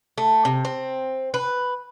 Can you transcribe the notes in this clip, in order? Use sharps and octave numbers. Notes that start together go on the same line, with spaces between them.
A3
C3
C4
B4